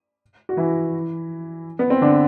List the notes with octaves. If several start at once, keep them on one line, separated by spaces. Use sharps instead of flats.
F#4
E3 E4
B3
C4
D3 D4